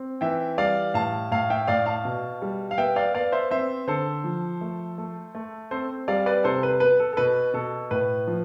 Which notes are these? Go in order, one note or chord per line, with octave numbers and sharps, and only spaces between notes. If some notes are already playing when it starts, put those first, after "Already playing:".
Already playing: C4
E3 E5 G5
G3 D5 F5
A2 F5 A5
A2 F5 A5
E5 G5
A2 D5 F5
F5 A5
B2
G3
F5
B3 E5 G5
D5 F5
B3 D5 F5
C5 E5
C4 C5 E5
D3 A4 C5
F3
A3
A3
A3
C4 A4 C5
G3 D5 F5
B4 D5
C3 A4 C5
B4
B3 B4
A4
A4
B2 B4
B2 A4
A2 B4
F3